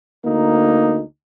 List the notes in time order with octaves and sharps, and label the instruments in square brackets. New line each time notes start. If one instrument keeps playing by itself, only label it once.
[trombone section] D2 A#3 D#4